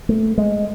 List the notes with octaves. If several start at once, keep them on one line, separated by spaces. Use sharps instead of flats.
A3
G#3